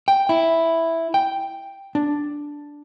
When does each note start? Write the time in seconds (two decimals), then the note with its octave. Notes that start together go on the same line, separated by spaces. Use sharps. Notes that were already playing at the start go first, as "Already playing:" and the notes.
0.08 G5
0.29 E4
1.14 G5
1.95 D4